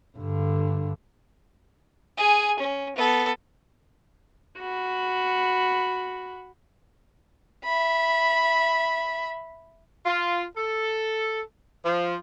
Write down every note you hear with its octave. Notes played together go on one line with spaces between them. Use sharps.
G2 D3
G#4 G#5
C#4
B3 A4
F#4 B5
E5 B5
F4
A4
F3